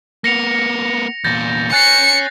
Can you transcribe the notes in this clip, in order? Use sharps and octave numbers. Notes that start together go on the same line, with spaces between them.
A#3 B3 A#6 C#7 F7
E2 A#2 G6 A6 A#6
C#5 G#5 F#6 A6 C7 C#7